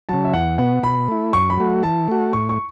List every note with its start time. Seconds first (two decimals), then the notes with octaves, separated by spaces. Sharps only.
0.09 C#3 F#3 A5
0.25 E5
0.33 E2 F#5
0.58 B2 B3 F#5
0.83 B2 B5
1.08 A3 E4
1.33 F#2 C#6
1.50 B5
1.58 F#3 A3 F#4
1.83 E3 A5
2.08 A3 F#4
2.33 A2 C#6
2.49 C#6